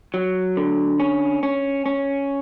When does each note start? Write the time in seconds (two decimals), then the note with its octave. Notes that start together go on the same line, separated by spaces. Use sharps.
0.14 F#3
0.57 D3
1.00 C#4
1.43 C#4
1.86 C#4